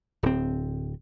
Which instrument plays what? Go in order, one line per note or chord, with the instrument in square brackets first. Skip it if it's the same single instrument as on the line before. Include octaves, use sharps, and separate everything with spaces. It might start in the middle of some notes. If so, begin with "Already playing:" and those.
[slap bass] D1 C4